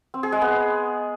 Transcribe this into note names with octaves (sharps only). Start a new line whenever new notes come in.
C4
G#4
G#3
B3